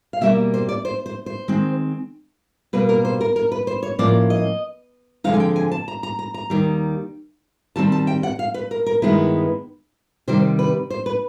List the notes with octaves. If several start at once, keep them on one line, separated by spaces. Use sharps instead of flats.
F5
B2 G3 A#3 E5
C5
D5
C5
C5
C5
D#3 G#3 C4
B2 G3 A#3 B4
A#4
C5
A#4
A#4
B4
C5
C#5
A2 F3 A#3 C#4 D5
D#5
D3 F3 G#3 C4 D#4 F5
G#5
G5
G#5
A5
A#5
A#5
A#5
A#5
D#2 D#3 G3
D#3 G3 C4 A5
A5
G5
F#5
F5
B4
A#4
A#4
G2 D#3 G#3 B3 E4 B4
C3 D#3 G3 C5
B4
C5
B4